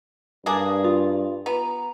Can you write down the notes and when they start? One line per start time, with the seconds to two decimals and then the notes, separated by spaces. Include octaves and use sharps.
0.46 G2 A#3 D4 G#4 D#6
0.84 F4
1.46 B3 A#5